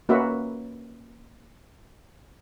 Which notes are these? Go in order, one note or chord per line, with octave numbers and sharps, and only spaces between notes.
A#3 C#4 F#4 B4 E5